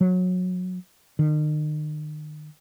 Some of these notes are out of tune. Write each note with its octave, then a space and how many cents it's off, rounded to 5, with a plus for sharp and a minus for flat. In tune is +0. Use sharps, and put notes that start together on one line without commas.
F#3 -25
D#3 -40